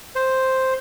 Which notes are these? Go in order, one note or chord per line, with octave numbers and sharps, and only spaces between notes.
C5